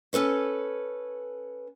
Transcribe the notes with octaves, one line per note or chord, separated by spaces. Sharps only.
C#4 A4 B4 C#5